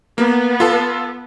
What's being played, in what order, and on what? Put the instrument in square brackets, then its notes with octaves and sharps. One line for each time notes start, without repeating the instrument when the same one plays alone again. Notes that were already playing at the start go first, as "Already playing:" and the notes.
[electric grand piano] A#3 [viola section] B3
[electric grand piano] F4 A4 A5